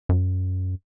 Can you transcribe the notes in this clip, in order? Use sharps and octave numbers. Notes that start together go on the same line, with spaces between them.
F#2